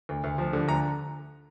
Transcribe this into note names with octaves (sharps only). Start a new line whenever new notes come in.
D2
D2
F3
D3
D2 A#5